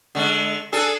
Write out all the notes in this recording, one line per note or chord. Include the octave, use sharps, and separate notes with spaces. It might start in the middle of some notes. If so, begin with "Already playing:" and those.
D3 G#3
D4 G#4 A4